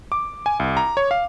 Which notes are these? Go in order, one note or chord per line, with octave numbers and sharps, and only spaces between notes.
D6
G#5
C2
A#5
C#5
F5